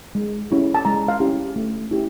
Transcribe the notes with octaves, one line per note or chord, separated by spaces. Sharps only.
G#3
C#4 E4 G4
A5
G#3 A#5
F5
C#4 E4 G4
A3
C#4 E4 G4